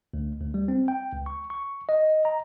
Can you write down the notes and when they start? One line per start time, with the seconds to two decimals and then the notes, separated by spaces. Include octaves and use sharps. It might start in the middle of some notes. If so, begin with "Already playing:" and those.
0.14 D2
0.40 D2
0.54 G3
0.68 C4
0.88 G5
1.13 C#2
1.26 C#6
1.50 C#6
1.89 D#5
2.25 A#5